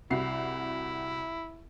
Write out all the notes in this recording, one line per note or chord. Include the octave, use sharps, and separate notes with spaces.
C2 E4 F#4 C7